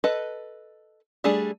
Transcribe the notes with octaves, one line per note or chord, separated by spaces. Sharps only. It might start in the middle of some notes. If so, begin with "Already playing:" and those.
A4 B4 D#5
G3 A3 D4 G#4